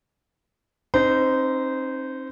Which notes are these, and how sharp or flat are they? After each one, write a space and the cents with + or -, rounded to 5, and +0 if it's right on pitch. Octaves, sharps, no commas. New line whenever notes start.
C4 +40 D#4 +0 C5 -20